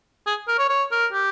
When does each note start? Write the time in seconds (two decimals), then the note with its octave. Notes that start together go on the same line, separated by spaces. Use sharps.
0.26 G#4
0.48 A#4
0.58 C#5
0.69 C#5
0.91 A#4
1.13 G4